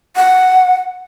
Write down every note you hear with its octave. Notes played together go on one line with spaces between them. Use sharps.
F#5